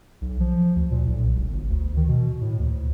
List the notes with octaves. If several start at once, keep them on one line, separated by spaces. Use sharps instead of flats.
B1
F3
D2
A#2
B1
E1
G1
D2
D#3
B2
A2
D2